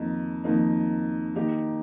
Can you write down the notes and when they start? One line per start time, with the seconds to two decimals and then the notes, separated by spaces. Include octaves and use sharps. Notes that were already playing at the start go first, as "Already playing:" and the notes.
Already playing: F2 D#3 A#3 D#4
0.44 F2 D#3 A#3 D#4
1.35 D#3 A#3 D#4 G4